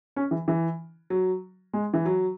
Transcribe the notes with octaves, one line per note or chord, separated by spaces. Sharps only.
C#4
E3
E3
F#3
G#3
E3
F#3